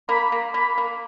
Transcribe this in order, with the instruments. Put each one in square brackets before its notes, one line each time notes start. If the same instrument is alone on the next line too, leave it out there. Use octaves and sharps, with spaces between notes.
[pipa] A#3 [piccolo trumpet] B5
[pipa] A#3
[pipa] A#3 [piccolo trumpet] B5
[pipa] A#3